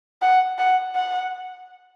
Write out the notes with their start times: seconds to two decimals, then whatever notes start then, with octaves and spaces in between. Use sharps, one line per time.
0.22 F#5
0.58 F#5
0.95 F#5